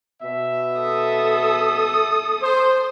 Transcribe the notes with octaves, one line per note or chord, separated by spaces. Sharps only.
B2 E5
A4 D#6
C5